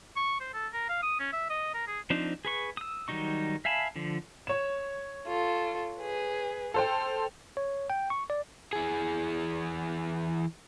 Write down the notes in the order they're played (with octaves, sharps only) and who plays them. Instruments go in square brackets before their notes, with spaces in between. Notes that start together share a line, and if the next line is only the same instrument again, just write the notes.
[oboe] C#6
C5
A4
A#4
F5
D#6
C#4
E5
D#5
A#4
G#4
[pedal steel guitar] F3 C4 D4 D#4
G#4 B4 C#6
D#6 E6
D#3 F#3 G3 D#4 C#6
E5 F5 G#5 A5 B5
D3 F3
[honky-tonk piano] C#5 E7
[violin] F4 A4
G#4 B4
[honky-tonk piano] A4 C5 G5 [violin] F6
[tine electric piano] C#5
G5
C#6
D5
[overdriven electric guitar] E3 G#4